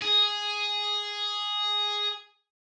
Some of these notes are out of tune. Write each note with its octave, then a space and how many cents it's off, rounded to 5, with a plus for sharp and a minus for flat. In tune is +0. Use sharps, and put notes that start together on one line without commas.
G#4 +0